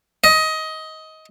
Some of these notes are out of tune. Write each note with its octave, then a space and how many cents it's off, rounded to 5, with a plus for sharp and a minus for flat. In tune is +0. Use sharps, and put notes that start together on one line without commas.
D#5 +20